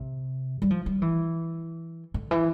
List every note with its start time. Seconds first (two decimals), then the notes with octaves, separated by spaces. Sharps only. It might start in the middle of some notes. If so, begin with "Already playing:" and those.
Already playing: C3
0.62 G3
0.70 F3
0.86 G3
1.02 E3
2.14 D3
2.31 E3